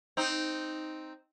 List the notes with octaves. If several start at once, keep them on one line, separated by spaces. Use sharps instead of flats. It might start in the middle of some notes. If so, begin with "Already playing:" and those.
C4 D#4